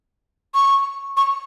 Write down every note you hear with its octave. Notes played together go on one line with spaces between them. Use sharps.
C#6
C#6